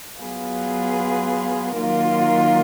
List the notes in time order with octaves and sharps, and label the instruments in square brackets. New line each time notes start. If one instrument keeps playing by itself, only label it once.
[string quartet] F#3 B3 F4 G#4 B4
D#3 F#3 A#3 F4 A#4